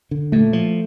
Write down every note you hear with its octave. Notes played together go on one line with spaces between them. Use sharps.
D3
A#2 A3
F3